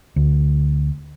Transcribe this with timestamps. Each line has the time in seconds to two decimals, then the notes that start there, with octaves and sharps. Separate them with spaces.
0.16 D2